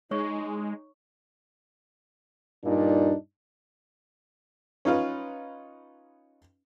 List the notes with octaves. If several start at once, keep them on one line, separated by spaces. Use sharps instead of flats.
G#3 D#4 C#5 C#6
G2 A#2 D4 D#4
C#4 D#4 F4 B4